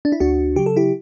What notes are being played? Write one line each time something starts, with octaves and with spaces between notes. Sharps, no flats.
D4
E4
D2 D4 F#4
C#3 F#3 G4
A4
E4 G4